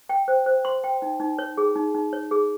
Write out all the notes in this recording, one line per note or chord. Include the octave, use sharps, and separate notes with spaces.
G5
C5
C5
C6
G5
D#4
D#4
C#5
G#4
D#4
D#4
C#5
G#4